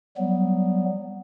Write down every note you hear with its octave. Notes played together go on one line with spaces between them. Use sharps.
F#3 G3 B3